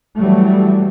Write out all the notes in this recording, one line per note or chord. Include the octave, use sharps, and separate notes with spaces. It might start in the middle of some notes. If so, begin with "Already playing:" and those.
E3 F#3 G3 A3